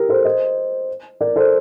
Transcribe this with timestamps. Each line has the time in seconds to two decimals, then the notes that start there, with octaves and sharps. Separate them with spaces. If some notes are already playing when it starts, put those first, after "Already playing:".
Already playing: G4 A#4
0.09 A4 C5
0.25 C5 D#5
1.21 A#4 D5
1.36 A4 C5